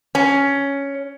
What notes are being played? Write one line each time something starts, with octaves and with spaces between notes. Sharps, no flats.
C#4